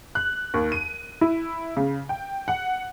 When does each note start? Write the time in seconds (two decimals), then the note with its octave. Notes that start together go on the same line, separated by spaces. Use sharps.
0.15 F#6
0.54 D#2
0.72 D#7
1.21 E4
1.77 C#3
2.09 G5
2.48 F#5